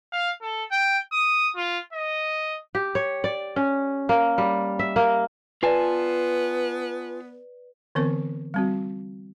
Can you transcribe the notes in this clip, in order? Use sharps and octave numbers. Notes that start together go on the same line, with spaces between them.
F5
A4
G5
D#6
F4
D#5
G4
C#5
D5
C#4
A#3
G3
E5
A#3
B3 F4 B4 D5 G#5 A5
D3 E3 B3 C4 A#4 C#6
G3 C4 F#4